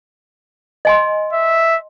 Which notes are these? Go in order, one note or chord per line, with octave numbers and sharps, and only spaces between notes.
D#5 G#5 C6
E5